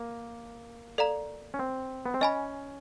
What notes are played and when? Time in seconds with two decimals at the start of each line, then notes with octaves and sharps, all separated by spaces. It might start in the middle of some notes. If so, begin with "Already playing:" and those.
Already playing: A#3
0.98 A4 D5 F5 A#5
1.54 C#4
1.59 C4
2.06 B3
2.14 C4
2.21 C#4 D#5 G#5 B5